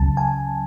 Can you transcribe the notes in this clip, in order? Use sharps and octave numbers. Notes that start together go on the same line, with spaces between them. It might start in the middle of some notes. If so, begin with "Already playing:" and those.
Already playing: C#2 C#3 F#3 A5
G#5